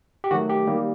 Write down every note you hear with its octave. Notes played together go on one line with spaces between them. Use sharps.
G4
D#3 F#3 A3 F#4
G4
D#3 G3 A#3